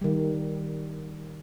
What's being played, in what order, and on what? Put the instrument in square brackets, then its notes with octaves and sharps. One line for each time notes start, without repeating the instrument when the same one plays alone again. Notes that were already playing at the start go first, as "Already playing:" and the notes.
[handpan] D#3 G3